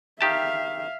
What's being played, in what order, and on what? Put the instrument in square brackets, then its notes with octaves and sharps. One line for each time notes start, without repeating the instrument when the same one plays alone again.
[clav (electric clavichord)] D#3 G4 A5 [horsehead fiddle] E5 F5